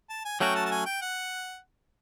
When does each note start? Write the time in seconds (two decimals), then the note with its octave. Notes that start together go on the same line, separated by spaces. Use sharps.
0.10 A5
0.25 G#5
0.40 F#3 A3 C#4 F#4 G5
0.55 A5
0.66 A5
0.71 G#5
0.86 G5
1.02 F#5